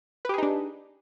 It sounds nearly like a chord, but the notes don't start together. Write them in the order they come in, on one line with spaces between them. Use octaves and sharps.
B4 G4 G#4 D#4 D4